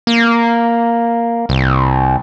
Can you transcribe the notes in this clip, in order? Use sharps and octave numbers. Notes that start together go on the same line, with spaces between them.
A#3
C2